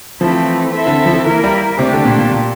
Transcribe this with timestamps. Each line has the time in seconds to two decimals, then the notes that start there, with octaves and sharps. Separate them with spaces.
0.21 E3 F3 A3 C4 E4 A4
0.73 C4 E4 A4 E5
0.87 D3
1.06 F3
1.13 E3
1.26 E3 A#3 E4 A#4
1.44 G3
1.79 C3 A3 D4 G4
1.93 D3
2.05 A#2
2.19 A#2
2.32 A#2